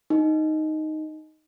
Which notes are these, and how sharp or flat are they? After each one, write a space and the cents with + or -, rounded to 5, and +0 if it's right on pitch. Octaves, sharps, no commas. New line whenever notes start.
D#4 +0